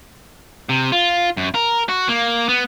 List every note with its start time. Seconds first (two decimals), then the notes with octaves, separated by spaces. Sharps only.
0.69 C3
0.92 F4
1.37 F#2
1.55 A#4
1.89 F#4
2.08 A#3
2.49 B3